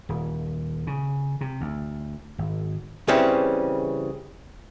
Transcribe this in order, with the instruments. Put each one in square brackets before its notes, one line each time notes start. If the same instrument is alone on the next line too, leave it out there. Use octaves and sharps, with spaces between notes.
[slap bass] D#1
C#3
C3
D2
G#1
[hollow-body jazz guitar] C#3 E3 G3 C4 C#4